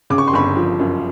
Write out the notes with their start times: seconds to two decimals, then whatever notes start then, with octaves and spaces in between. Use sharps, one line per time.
0.10 C#3 D6
0.18 C#6
0.27 C6
0.33 G1 B5 C#6
0.56 F3
0.79 F#2